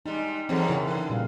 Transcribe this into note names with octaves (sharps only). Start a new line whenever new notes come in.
G3 G#3 D#4
E2 F#3 C4 G#4 A4
C#3 E4 A#4
D3 B4
A#2 G3 F5